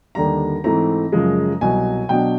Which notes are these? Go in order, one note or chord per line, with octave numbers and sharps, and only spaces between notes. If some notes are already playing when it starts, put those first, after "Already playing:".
D#2 D3 G3 A#5
G#2 E3 A3 C4 A#5
F#2 C#3 F3 G#3
C2 B2 F#3 G#5
B2 F#3 B3 D4 G5